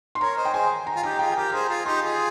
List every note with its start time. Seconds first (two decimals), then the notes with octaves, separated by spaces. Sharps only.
0.15 C6
0.21 A#4 C#5 A#5
0.37 C5 D#5
0.45 G5
0.54 G#4 C5 G#5
0.87 A#5
0.96 F4
1.03 D#4 G4 A#5
1.19 F4 G#4 G5
1.36 G4 A#4 A#5
1.52 G#4 C5 A#5
1.69 F4 G#4
1.86 D#4 G4 C6
2.02 F4 G#4